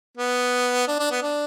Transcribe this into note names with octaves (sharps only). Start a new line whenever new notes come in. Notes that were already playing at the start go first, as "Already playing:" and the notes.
B3
D4
D4
B3
D4